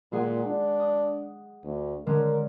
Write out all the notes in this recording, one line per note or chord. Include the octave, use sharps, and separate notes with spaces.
A#2 G#3 G#4 F#5
D4
D#6
D2
D3 G#3 C#4 A#4